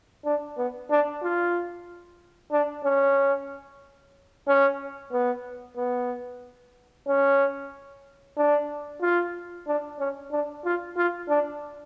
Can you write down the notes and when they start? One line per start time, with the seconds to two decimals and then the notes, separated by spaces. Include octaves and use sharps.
0.25 D4
0.58 B3
0.91 D4
1.23 F4
2.52 D4
2.85 C#4
4.48 C#4
5.12 B3
5.77 B3
7.08 C#4
8.37 D4
9.02 F4
9.67 D4
9.99 C#4
10.32 D4
10.65 F4
10.97 F4
11.29 D4